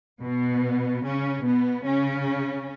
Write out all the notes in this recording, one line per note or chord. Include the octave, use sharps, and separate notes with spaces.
B2 B3
C#3 C#4
B2 B3
C#3 C#4